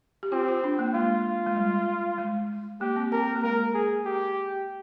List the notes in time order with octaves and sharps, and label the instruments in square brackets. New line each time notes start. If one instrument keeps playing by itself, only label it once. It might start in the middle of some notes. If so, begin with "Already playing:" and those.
[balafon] G4
[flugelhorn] C4 [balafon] F4
[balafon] F4
D4
A#3
[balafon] G#3 [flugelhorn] F4
[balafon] G#3
G3
G#3
[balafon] A#3 [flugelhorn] G4
[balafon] C4
[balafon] C4 [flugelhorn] A#4
[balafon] A#3
[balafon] G#3 [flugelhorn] A#4
[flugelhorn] G#4
G4